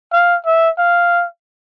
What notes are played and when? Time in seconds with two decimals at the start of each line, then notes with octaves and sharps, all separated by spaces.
0.12 F5
0.46 E5
0.78 F5